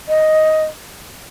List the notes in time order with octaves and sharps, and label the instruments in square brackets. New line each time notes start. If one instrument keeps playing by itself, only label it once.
[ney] D#5